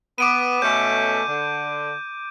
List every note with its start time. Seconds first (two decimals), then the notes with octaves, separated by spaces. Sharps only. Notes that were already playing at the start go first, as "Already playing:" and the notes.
0.18 B3 D6 D7 D#7
0.62 B2 A3 C#4 G6
1.28 D3